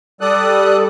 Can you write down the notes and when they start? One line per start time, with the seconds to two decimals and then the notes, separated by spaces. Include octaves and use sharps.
0.21 G3 A4 D5 D#6 F#6